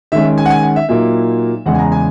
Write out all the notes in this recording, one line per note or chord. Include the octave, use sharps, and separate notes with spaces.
D#3 G#3 C#4 E5
G#5
F#5
G#5
F#5
E5
A#2 F#3 A#3 D#4 E5
E2 C#3 G#3 F#5
G#5
A#5
G#5